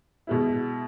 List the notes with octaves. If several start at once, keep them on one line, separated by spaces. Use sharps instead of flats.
B2 G#3 B3 E4